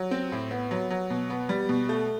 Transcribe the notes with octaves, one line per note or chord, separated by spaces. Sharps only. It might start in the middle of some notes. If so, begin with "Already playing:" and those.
Already playing: F#3
C4
A2
B3
F#3
F#3
B2
B3
G3
B2
A3